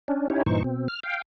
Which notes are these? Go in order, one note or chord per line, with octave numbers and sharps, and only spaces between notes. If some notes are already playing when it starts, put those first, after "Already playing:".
C#4 D4
C#4 D#4 E4 G4 C#5
G2 A#2 E3 D#4 C5 C#6
B2 C4
F6
F5 G5